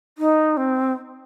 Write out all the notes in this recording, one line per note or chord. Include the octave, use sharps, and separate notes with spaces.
D#4
C4